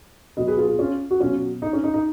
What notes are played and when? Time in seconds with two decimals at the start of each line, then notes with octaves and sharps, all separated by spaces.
0.37 B2 F#3 B4 D#5
0.47 G#4 B4
0.57 F4 G#4
0.68 F4 G#4
0.79 C#4 F4
1.11 F#4
1.20 B2 F#3 C#4 F4
1.62 D#4
1.73 C#4
1.84 D#4
1.94 D#4